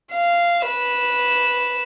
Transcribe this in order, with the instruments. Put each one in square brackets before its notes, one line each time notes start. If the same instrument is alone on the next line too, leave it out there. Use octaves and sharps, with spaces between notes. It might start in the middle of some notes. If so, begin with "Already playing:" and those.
[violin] F5
B4 E7